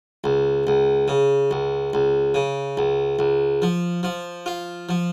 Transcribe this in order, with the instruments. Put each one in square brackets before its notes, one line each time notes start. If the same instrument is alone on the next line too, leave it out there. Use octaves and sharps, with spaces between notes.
[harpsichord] C#2
C#2
C#3
C#2
C#2
C#3
C#2
C#2
F3
F3
F4
F3